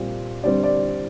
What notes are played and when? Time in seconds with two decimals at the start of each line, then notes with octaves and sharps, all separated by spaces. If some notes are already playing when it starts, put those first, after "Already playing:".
Already playing: A#2 G3 C4
0.42 D3 G3 C4 D5
0.63 D5